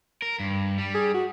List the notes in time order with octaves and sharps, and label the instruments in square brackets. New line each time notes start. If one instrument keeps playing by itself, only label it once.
[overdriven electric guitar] A#4
G2
G3
[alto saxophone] G#4
F#4